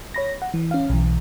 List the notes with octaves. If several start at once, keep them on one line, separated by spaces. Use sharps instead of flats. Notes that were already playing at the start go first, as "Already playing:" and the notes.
C#5 B5 A#6
F#5
E3
C#4 F5
B1 E3